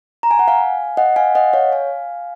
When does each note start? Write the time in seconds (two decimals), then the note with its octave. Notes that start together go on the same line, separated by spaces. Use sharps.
0.23 A#5
0.31 G#5
0.39 F#5
0.48 F5 G#5
0.97 D#5 F#5
1.16 F5 G#5
1.35 D#5 F#5
1.53 C#5 F5
1.72 F5 G#5